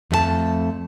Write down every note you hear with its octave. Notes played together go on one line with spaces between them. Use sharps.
F2 A3 G#4 A5